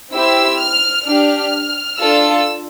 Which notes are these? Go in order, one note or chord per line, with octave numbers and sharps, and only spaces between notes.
C4 E4 G4 E6
F6
D4 G4 F6
D4 F4 A4 E6